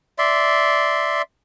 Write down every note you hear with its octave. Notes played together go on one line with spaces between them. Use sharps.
D5 E5 C6